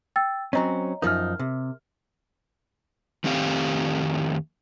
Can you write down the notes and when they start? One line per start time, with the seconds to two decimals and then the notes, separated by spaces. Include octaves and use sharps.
0.16 G5 E6 A6
0.53 F#3 C4 C#4 C#5 D#5 A#5
1.02 F#2 F3 D#4 A#4 F6
1.39 C3
3.24 F2 D#3 A3 C4 G4 F5